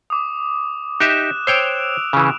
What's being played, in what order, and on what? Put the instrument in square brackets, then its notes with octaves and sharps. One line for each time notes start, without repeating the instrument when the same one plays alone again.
[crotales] D6 D#6
[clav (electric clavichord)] D#4 G4 E5 [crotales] F#6 E7
[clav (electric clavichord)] C5 C#5 G5 [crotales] E6 D7 F7
[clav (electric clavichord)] C#3 E3